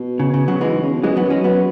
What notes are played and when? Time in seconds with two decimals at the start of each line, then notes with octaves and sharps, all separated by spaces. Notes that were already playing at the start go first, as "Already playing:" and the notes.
Already playing: B2
0.19 C#3
0.34 C#3
0.48 C#3 F#3
0.61 E3 G#3
0.72 G#2
0.82 C#3
0.93 B2
1.03 F#2 E3 G#3
1.17 G#2 F#3 B3
1.24 F#2
1.30 G#3 C#4
1.44 F#3 B3